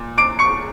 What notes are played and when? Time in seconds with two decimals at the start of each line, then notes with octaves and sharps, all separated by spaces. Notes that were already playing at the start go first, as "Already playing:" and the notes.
Already playing: A#2
0.18 D6 D7
0.39 C#6 C#7